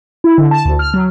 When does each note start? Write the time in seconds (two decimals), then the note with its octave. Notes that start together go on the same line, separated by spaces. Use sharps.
0.24 E4
0.38 D3
0.51 A5
0.65 D2
0.79 F6
0.94 F#3